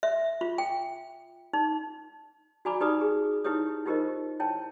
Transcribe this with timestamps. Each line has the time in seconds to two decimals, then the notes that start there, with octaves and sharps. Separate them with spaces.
0.03 E5
0.41 F4
0.58 G5
1.53 D#4
2.65 F#4 D5 G#5 A#5 B5 D6
2.81 D#4 G4 B4 D5 A#5 D#6
3.01 G#4
3.44 D#4 E4 G4 B4 C#5 D#6
3.86 D#4 F4 G4 A#4 C5 D#5
4.40 E4 C#5 G5 A5